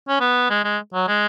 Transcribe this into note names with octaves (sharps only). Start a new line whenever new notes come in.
C#4
B3
G#3
G#3
F#3
G#3